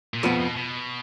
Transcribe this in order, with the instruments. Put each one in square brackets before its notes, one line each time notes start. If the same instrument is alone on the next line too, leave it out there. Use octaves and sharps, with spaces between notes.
[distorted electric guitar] A#2
[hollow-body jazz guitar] F2 F3 B3 [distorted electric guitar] B2
[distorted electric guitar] B2
B2